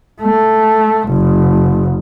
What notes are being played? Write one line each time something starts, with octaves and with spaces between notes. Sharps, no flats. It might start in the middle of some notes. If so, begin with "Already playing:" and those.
A3
F#1